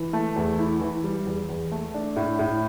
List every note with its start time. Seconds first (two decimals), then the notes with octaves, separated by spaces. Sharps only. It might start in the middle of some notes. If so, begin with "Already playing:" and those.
Already playing: E3
0.13 A3
0.36 E2
0.59 E4
0.81 E3
1.04 G3
1.26 E2
1.49 E2
1.72 A3
1.94 D4
2.16 A2
2.39 A2